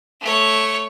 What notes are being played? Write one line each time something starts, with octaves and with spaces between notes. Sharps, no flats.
A3 C#5